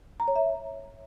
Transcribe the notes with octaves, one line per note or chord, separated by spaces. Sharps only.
A#5
C#5
E5